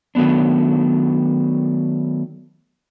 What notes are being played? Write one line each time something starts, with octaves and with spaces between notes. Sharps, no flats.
D#3 F#3 A3 B3 D4